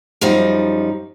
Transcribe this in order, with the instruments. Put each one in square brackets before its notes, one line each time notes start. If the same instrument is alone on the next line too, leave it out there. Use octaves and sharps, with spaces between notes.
[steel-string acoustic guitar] F#2 F3 G3 D#4